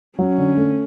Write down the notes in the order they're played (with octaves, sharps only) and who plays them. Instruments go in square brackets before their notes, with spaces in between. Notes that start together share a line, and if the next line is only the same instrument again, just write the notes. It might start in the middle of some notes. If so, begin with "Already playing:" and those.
[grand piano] F#3 [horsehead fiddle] C#4
[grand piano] D3
A3